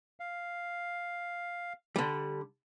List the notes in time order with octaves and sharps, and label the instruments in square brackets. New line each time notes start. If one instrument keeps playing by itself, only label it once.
[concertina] F5
[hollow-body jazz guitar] D3 G3